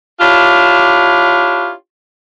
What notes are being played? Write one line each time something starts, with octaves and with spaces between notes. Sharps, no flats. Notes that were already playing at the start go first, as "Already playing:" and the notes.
D4 E4 F4 G4 C#5